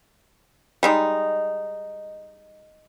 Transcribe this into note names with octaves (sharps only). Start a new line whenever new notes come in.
G3 G#3 D#4